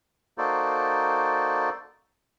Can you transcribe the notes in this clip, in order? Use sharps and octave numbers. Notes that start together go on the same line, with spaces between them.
A#3 D#4 F#4 A4 C5 D5